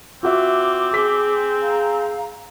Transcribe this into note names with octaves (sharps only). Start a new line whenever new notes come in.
C4 F4 F#4 E5 D6
G#4 B6
F5 A#5